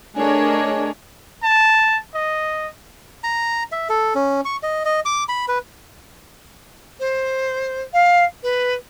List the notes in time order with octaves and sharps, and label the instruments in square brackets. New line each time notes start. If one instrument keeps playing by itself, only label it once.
[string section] A3 D4 G#4 A#4 C#5 D#5
[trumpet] A5
D#5
[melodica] A#5
E5
A4
C#4
C#6
D#5
D#5
D6
B5
B4
[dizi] C5
F5
B4